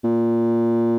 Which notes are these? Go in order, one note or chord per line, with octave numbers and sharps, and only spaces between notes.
A#2